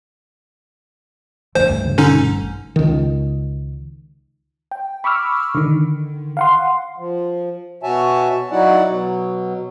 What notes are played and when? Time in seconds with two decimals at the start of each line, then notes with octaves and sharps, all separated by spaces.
1.55 G2 A3 C5
1.68 D2
1.85 C#3
1.98 B2 D3 C#4 D#4
2.17 E1
2.32 G#1
2.76 C#2 D#3
4.71 G5
5.04 B5 C#6 D6 E6 F6
5.55 D3 D#3
6.37 F5 F#5 C6
6.98 F3
7.83 B2 F#4 C#5 E5 G#5 A5
8.51 F#3 D#4 E4 F#4 D5 F#5
8.87 B2 F#3